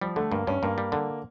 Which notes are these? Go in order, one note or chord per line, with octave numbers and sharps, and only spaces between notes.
F3 G3
D3 A3
G2 A#3
G2 C#4
G2 A#3
G3
D3